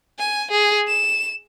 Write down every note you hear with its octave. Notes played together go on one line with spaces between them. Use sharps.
G#5
G#4
E7